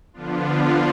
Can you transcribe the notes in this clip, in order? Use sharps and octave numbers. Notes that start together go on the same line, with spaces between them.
D3 F3 B3 D4 F4